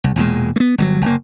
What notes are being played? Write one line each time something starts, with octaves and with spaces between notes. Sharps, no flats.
C2
E1 E2 A#2 G#3
A3 B3
G1 D3 F#3
F#1 A#3